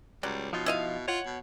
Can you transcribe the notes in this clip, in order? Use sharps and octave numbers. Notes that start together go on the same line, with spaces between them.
C#2 F#3 G3
B2 F3 D#4 F4
E4 D#5 F5
F4 C#5 F#5
B2